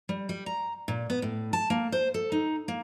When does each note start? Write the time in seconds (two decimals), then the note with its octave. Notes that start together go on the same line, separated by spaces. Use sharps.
0.09 G3
0.29 G3
0.46 A#5
0.88 A#2
1.10 B3
1.22 A2
1.53 A5
1.70 A#3
1.92 C5
2.14 A4
2.32 D#4
2.68 A#3